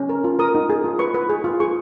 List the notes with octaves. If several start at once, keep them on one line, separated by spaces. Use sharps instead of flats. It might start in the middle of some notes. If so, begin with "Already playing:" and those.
Already playing: C#4
A#4
F4
A#4 D#6
D#4
G#4
F4
B4 C#6
B4
G#4
F4
G#4 C#6